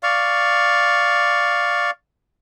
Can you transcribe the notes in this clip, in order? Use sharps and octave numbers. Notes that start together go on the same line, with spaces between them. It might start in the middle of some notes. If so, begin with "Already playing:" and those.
D5 F5 C#6